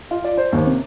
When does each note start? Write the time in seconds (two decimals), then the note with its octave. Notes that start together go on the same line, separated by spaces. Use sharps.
0.11 F4
0.24 D5
0.37 C5
0.52 D#2
0.67 C3